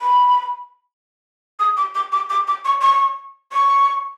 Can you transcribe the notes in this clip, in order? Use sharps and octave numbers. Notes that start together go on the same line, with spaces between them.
B5
D#6
D6
D6
D6
D6
D6
C#6
C#6
C#6